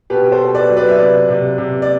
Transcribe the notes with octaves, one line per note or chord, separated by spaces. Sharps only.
B2 G4 B4
A4 C5
B2
B4 D5
F#3
B4 D5
E5
C3 B4 D5
C3
C3
D5